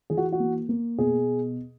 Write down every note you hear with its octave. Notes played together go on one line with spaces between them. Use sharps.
E3 G#4
F#4
F#4
A#3
A#3
B2 G#4